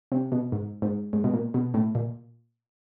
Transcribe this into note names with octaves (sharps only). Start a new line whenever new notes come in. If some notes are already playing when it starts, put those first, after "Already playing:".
C3
B2
G#2
G#2
G#2
B2
A#2
B2
A2
A#2